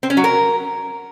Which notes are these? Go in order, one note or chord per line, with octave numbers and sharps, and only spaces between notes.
C4
C#4
F#3
A#4